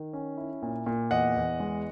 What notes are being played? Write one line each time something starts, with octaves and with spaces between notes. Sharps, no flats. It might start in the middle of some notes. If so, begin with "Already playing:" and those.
Already playing: D#3
C#4
E4
A#2
A#2
E2 D#5 F#5
E2
G#3